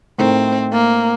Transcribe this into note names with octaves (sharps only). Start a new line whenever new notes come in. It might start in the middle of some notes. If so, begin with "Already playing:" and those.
A2 A3 C4 D#4 A#4
A#3